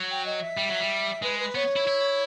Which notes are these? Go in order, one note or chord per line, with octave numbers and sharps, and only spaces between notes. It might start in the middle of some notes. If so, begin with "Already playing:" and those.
Already playing: F#3
G5
D#5
E5
G3
F#3
G3
G#3 B4
B4
B3 C#5
E4
E4